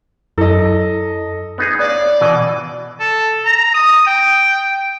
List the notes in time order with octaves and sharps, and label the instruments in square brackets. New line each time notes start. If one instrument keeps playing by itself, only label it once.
[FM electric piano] F#2 [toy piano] E4 [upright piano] A4 D#5
[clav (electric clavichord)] B3 D#4 G#4
[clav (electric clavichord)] B3 C#5 F5 [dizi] D5
[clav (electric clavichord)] B2 E3 D#5
[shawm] A4
A#5
D#6
G5